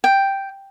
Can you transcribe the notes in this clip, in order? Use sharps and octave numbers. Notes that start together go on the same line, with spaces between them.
G5